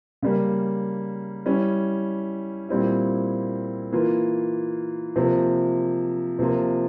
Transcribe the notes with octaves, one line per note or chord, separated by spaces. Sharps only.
C#3 G3 A#3
G3 C#4 E4
A#2 G3 C4 E4
E3 A#3 F4
C3 F3 A#3
C3 F3 A#3 F4